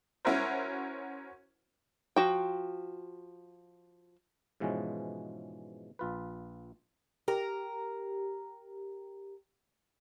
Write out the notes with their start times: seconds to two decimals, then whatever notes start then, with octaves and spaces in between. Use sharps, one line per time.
0.25 C#4 E4 F#4 A#4 C5
2.16 F3 F#4 G5
4.60 G#2 B2 E3 F3 G#3 C#4
5.99 A#1 F4 B4
7.28 G4 A#4